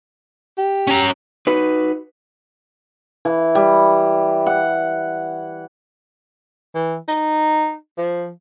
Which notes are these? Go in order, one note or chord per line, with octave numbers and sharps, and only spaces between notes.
G4
C#4 A#5
D#4 F#4 B4
E3
G3
F#5
E3
D#4
F3